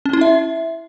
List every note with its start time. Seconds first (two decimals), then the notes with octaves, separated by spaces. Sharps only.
0.05 C#4
0.13 E4
0.21 E5